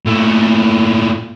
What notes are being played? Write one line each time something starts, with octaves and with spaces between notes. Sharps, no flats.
A#2 A3